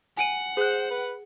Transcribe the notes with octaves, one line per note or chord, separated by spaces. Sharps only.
F#5 G#5 D7 D#7
G#4 C5 F#6
B4